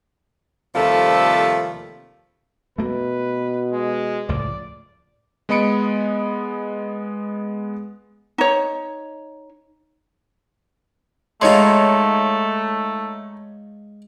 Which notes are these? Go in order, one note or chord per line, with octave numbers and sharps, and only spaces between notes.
D#2 C3 F3 G3 A3 A4
B2 A3 A#3 B4
G#3
C#2 A2 F3 D5
G#3 B3 D#5 B5 C#7 D7
D#4 C#5
G#3 A3 D#4 F4 C#5 C6